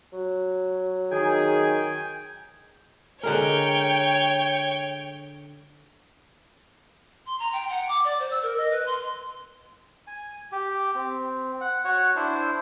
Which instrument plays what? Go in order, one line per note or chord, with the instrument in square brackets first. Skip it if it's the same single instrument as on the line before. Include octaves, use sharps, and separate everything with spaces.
[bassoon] F#3
[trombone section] D#3 G#4 [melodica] G5 G#5
[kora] D3 G#3 A#4 [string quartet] C#5 G5
[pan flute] C6
A#5
G5
F#5
D6
D5
C5
E6
A#4
D#5
B4
C6
[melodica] G#5
G4
C4
F#5
F#4 C#5 F#5
D4 E4 C5